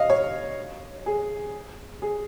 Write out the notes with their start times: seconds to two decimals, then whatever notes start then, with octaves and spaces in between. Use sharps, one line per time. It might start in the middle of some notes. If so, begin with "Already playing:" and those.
Already playing: D#5 F5
0.10 C#5
1.06 G#4
2.02 G#4